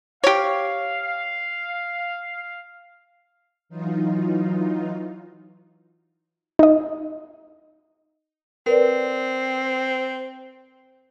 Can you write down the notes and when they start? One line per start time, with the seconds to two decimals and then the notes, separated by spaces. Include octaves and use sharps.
0.24 G4 C#5 F5
3.69 E3 F#3 D#4 F4
6.59 D#4 D#5
8.66 C4 A#4 B4 D5